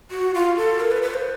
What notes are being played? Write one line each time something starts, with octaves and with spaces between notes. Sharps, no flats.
F#4
F4
A4
A#4
B4
B4
C5